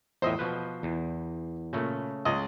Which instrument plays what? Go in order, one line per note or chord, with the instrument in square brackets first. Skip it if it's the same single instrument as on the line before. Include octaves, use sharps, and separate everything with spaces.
[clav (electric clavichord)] E2 A2 [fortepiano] C5 D#5 E5
[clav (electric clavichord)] B2 F3 B4
E2
[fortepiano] A#2 [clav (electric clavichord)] C#3 A3
[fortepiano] C#2 D#5